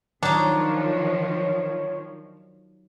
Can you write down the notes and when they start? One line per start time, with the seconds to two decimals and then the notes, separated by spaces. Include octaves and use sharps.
0.23 D#3 F3 F#3 D4 D#4 C#5